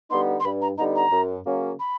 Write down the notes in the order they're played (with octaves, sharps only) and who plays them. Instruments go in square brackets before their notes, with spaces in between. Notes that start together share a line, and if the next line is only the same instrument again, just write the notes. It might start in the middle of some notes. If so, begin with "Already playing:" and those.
[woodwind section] D3 G3 B3 D#4 [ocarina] C6
[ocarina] C6
[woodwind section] G2 [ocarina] B5
[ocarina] A#5
[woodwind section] D3 G3 B3 D#4 [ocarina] A#5
[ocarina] A#5
[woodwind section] F#2
C#3 F#3 A#3 C#4
[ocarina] B5